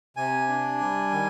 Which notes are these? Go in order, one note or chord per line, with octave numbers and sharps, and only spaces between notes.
C3 G#5
D4
G3
D#3